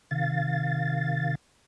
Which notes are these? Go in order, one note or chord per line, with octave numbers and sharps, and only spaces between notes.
C3 D#3 F5 A6